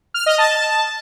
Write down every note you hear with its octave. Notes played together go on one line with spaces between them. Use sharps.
F6
D#5
A5